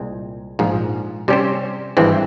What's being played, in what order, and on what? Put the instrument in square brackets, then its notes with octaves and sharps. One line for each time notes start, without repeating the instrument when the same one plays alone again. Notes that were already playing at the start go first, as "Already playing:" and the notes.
Already playing: [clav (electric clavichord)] C2 A#2 G#3 C4
A#1 G#2 F3
C3 G3 C#4 G4 C5
G#1 G2 E3 G#3 C4